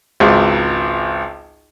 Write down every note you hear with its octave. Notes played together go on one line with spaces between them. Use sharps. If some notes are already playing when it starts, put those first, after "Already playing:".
G#1 C#2